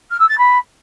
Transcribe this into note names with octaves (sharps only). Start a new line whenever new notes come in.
F6
E6
A6
B5